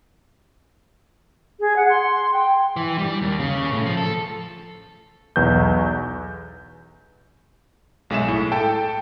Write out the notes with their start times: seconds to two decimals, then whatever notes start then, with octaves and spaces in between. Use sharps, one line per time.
1.59 G#4
1.76 F#5
1.88 C6
2.33 G5
2.76 E3
2.98 G3
3.21 D#2
3.39 C#3
3.71 A2
3.86 F3
3.97 A4
5.36 B1 E2 B4 G6
8.10 B1 G#3 G#4 E5 E7
8.28 A2
8.52 A4 G5 A5